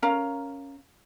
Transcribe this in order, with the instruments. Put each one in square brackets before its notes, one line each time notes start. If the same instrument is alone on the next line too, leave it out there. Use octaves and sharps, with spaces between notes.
[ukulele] C#4 A#4 F5 A#5